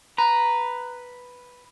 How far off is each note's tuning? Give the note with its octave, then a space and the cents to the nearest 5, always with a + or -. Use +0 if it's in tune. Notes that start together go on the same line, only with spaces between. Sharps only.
B4 +0 A#5 +0